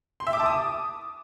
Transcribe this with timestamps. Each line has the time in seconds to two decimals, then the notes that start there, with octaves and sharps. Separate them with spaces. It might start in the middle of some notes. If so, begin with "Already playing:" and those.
0.20 C6
0.27 E5
0.33 D6
0.39 A5
0.46 D#6